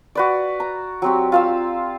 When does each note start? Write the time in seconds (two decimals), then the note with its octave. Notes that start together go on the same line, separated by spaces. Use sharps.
0.15 F#4 B4 D5
0.60 A#5
1.02 F#3 C4 G4
1.32 F4 F5 E6